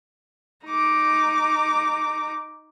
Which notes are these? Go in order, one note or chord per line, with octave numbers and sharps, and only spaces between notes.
D#4 D6